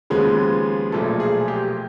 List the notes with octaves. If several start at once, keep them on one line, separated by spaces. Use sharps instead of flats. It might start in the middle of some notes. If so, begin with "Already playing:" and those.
D#2 C#3 F3 G#3 B3
B1 A#2 F3 A3 A4
G#4
G4